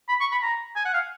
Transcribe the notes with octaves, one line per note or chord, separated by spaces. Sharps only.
B5
C#6
B5
A#5
G#5
F#5
F5